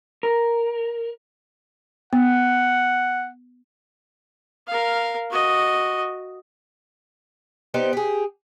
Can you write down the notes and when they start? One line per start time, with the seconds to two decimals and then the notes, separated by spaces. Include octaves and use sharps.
0.23 A#4
2.13 B3 F#5
4.68 A#4 F5
5.31 F#4 D#5
7.74 B3 D#4 G4 C5
7.93 G4 G#4